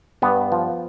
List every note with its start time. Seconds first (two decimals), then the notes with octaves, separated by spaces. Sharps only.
0.22 G2 B3
0.52 F3